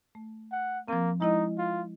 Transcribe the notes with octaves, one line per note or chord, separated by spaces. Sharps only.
A3
F#5
F3 A#3 C4
G#3 D#4 E4 D#5
F4